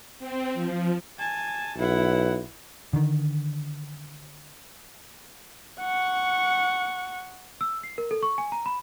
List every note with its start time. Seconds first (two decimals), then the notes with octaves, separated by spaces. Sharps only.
0.19 C4
0.54 F3
1.19 G#5 A5
1.77 B1 E4 F#5
2.93 D3 D#3
5.81 F#5 C#6
7.61 E6
7.83 C7
7.98 A#4
8.11 A4
8.23 C#6
8.38 G#5
8.52 A#5
8.66 B5